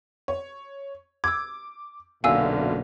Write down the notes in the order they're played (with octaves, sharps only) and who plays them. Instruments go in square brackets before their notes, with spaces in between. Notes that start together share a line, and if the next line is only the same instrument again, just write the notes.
[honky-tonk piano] C#5
[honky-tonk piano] D6 [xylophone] E6 G#6
[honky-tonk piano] F#1 F#2 [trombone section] B1 A#2 D3 [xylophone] F5 G#5 E6